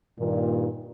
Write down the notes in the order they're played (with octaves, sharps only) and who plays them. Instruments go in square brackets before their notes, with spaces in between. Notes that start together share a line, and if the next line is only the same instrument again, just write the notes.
[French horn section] G2 A#2 D#3